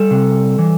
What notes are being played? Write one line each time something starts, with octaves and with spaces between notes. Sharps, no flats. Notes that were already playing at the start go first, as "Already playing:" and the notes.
Already playing: G3 A4
C3
E3